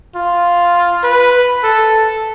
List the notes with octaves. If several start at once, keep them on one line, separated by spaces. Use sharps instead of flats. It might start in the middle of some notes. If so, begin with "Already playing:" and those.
F4
B4
A4